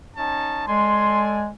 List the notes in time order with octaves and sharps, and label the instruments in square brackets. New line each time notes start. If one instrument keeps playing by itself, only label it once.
[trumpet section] C#4 D#4 A5
[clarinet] G#3 [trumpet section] A4 D5 G#5 [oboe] C6